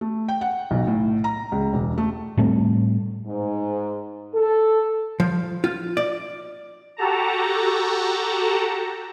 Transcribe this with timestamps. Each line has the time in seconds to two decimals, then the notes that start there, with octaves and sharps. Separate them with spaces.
0.01 A3
0.28 G5
0.41 F#5
0.71 B1
0.87 A2
1.24 A#5
1.52 C#2
1.73 E1
1.98 A3
2.38 A2 G3 A3 C4
3.26 G#2
4.35 A4
5.20 F3
5.64 F4
5.97 D5
6.97 F#4 G4 A4 A5 A#5